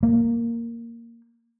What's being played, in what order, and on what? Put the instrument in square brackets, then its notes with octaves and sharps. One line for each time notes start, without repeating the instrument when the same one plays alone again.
[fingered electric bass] A#3